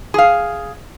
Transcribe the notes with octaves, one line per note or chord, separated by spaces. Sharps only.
G#4 F5